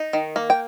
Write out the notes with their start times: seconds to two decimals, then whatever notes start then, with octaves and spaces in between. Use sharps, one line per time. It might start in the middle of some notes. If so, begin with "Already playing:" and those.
Already playing: D#4
0.13 D#3
0.36 A#3
0.50 G5